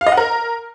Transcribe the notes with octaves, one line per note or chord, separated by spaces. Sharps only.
F5
D#5
F#5
A#4